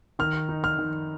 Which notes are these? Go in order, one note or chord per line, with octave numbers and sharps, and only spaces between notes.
D#3 F6
D#4
F6
D#3